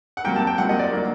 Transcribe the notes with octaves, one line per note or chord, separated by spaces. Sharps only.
F#5
C3 F#3 A#3 G5
A5
G5
C3 F#3 A#3 F#5
D#5
D5
D3 F#3 A#3